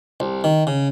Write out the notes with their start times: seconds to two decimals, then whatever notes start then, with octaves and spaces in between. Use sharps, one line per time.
0.20 C2
0.44 D#3
0.67 C#3